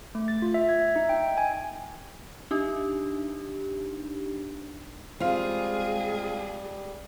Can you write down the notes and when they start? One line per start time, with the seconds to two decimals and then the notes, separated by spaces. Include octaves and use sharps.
0.15 A3
0.28 A6
0.42 F4
0.54 E5
0.69 G#6
0.81 E5
0.96 D#4
1.09 G5
1.23 D#5
1.38 G#5
2.51 D4 D#4 G4
5.20 G3 G#3 C4 F4 G#4 F5